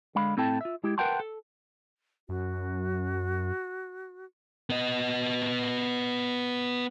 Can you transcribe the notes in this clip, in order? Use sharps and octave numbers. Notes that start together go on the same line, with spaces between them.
D3 G#3 F5 B5
A2 C4 E4 A4 G5 A5
F4 E5
G#3 E4 G4
A#4 B4 F#5 G5 A5 C6
A4
F#2 F#4
B3 D#5